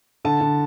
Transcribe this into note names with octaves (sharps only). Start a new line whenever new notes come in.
D3 A5
D3